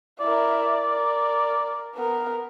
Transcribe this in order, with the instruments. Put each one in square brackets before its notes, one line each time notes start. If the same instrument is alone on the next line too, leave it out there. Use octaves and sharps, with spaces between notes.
[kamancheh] E4 A#4 [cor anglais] D5
[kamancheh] A#4
B3 A#4